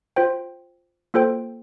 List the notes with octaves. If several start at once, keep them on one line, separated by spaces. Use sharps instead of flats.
F4 C5 G5
A#3 F4 A4 C5 G5